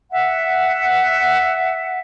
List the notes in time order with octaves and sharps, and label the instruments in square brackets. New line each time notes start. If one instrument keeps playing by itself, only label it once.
[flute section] E5 F#5